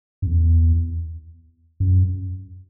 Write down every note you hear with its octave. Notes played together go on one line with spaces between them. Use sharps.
F#2
E2
F#2